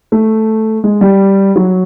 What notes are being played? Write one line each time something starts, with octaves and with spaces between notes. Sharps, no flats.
A3
G#3
G3
F#3